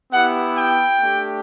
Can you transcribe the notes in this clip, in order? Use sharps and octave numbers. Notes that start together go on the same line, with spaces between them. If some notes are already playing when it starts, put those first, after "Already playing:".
B3 E4 G4 F#5
G5
A3 D4 G4